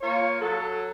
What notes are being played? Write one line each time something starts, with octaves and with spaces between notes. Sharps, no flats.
A#3 F4 C#5
F#3 A4